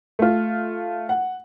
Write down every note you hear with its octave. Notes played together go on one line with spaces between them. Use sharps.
A3 F4
F#5